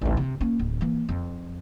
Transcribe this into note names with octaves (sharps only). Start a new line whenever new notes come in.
A1 D#2
C3
A#3 C#4
D1
E3 A#3
F2